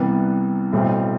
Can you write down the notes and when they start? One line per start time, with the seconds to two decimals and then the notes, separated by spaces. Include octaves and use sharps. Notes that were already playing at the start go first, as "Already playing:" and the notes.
Already playing: C2 C3 E3 G3 B3
0.73 B1 A2 E3 G3 C4